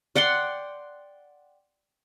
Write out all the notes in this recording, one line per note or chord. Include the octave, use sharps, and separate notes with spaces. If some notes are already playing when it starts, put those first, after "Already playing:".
D5 F#5 G5 C6